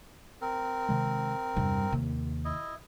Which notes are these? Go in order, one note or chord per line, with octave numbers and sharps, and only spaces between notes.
C4 A#4
C3 D#3 G#3
E2 G2 C3 G3
D#2 C3 A#3
E4 D#5